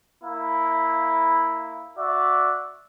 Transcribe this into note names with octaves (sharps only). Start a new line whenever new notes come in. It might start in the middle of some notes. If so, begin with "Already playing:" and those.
A#3 E4
F#4 D5 E5